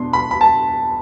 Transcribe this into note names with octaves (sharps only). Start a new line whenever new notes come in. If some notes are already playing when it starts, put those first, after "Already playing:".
Already playing: B2 B3 D4 C6
B5
B5
A5